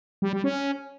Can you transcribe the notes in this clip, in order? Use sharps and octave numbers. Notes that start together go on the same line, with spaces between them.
G3
G3
C#4